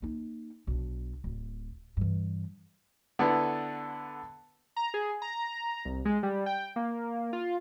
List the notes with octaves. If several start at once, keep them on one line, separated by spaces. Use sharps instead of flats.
A#3 D#4
B1 D4
D1
G2 E3
D3 B3 E4 A4 B4
A#5
G#4
A#5
C2
G#3
G3
G5
A#3
F4